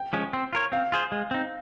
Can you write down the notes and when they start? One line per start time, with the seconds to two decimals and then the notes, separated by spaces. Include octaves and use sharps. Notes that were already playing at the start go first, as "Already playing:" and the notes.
Already playing: G5
0.13 F3 G#3 C#4
0.33 C4
0.53 F4 A#4 C#5
0.72 C4 F5
0.92 F4 G#4 C5
1.12 G#3
1.31 C4 D#4